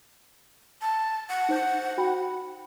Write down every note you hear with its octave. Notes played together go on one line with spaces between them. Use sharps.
A5
F#5
D#4 C5 G6
F#4 G5 B5